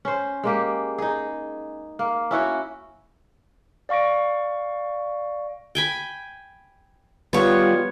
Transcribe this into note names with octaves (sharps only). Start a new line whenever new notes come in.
C#4 C5
G#3 A#3 G4
D#4 G#4
A#3
C#4 E4 F#4 C#5
D5 F5 C#6 A#6 D7
G5 G#5 B5
G3 B3 F4 C#5